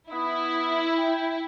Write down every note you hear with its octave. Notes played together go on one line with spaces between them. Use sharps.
B3 E4 D#6
G5